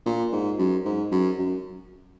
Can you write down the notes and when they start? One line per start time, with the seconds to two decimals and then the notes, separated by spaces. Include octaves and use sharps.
0.06 A#2
0.32 G#2
0.59 F#2
0.85 G#2
1.12 F#2
1.38 F#2